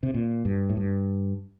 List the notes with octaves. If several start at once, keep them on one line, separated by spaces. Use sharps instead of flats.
C3
A#2
G2
A2
G2